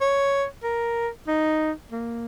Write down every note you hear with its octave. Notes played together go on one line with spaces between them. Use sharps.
C#5
A#4
D#4
A#3